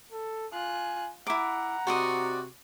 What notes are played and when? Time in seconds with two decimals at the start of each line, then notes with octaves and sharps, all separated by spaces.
0.12 A4
0.53 F4 G#5 F#6
1.27 E4 F#5 A#5 D6
1.87 C3 F#4 C5 D5 D#5